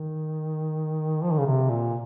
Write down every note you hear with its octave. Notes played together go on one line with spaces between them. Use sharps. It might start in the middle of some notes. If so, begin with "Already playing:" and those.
Already playing: D#3
F3
D#3
C#3
C3
A#2